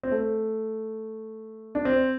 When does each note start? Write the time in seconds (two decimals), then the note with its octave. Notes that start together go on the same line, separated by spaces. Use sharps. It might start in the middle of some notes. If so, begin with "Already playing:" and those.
0.03 C4
0.11 A3
1.75 D4
1.85 C4